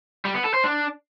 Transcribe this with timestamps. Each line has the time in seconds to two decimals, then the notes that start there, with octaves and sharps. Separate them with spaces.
0.25 G3
0.35 B3
0.44 A4
0.54 C5
0.64 D4